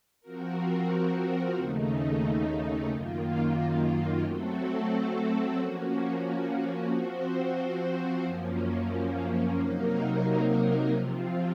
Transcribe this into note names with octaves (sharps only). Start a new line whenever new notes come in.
F3 C4 F#4 A#4
D#2 C#3 A3 D#4
F#2 D#3 A#3 F4
F#3 A3 C4 F#4 A4
F3 A#3 C#4 F#4
F3 C4 F#4 C5
F#2 F3 A#3 C#4
C3 F#3 A#3 D#4 A#4
C3 F3 C4 F4